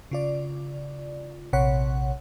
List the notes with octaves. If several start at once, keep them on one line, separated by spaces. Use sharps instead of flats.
C#3 F4 D5
A#1 C3 C#5 F#5